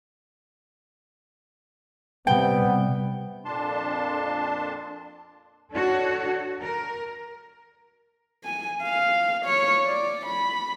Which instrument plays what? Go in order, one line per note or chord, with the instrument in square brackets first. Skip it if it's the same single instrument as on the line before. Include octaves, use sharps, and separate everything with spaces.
[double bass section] C3 [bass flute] G3 [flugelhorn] B3 [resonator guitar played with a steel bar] G5
[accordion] F2 A#2 D4 A5 C6
[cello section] D4 F#4 A4 C#5
A#4
[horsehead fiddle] G#5
F5
C#5
D5
B5